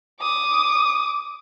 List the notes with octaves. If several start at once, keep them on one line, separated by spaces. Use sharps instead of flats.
D6 D#6